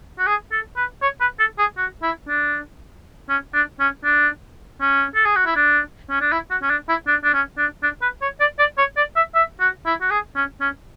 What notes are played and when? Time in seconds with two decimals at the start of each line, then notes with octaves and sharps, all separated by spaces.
0.19 F#4
0.27 G#4
0.52 A4
0.77 B4
1.02 C#5
1.21 B4
1.39 A4
1.59 G#4
1.78 F#4
2.03 E4
2.28 D4
3.29 C#4
3.54 D4
3.80 C#4
4.05 D4
4.81 C#4
5.15 A4
5.25 G#4
5.36 F#4
5.46 E4
5.56 D4
6.10 C#4
6.21 D4
6.32 E4
6.51 F#4
6.62 C#4
6.70 D4
6.89 E4
7.07 D4
7.24 D4
7.34 C#4
7.58 D4
7.83 D4
8.02 B4
8.22 C#5
8.40 D5
8.59 D5
8.78 C#5
8.97 D5
9.16 E5
9.35 E5
9.60 F#4
9.86 E4
10.02 F#4
10.11 G#4
10.36 C#4
10.61 C#4